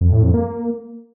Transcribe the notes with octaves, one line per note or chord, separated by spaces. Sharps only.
F2
A2
F2
A#3